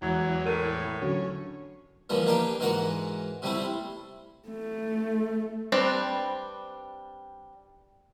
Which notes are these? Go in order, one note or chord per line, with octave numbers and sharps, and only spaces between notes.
E2 E3 F#3 G#3
A2 A#4 D#7
D3 F#3 C#4
A#2 E3 F3 G3 B3
A#3 D4 D#4 G4 G5
G#2 E3 F#4 A#4 F#5
C3 G3 A3 C4 E4
A3
G3 C4 D4 B4 D5